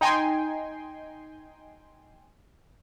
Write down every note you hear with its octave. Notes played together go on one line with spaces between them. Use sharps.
D#4 G5 G#5 C6